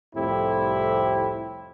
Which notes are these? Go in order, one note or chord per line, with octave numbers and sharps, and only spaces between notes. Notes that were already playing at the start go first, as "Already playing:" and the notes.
C2 F2 A2 E4 G4 C5